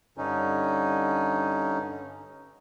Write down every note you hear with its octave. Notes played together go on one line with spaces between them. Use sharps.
G2 D3 C#4 D#4